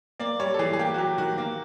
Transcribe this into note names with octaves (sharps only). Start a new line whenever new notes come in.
A#3 D5
G3 C#5
A4
E3 G#4
G#4
A#3 G4
F#4
F#3 G4
D#3 F#4
A#3